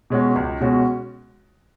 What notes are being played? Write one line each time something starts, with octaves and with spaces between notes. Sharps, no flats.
B2 G#3 C#4 F#4
C#2
B2 G#3 C#4 F#4